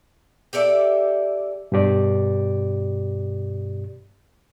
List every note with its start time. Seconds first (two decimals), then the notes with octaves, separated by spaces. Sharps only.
0.53 G4 A4 D5 E5
1.72 G2 B2 G4 D5